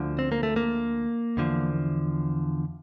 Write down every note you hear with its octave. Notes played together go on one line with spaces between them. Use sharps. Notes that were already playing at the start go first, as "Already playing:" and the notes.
Already playing: D2 D3 F3
C4
A#3
A3
A#3
E2 D3 F3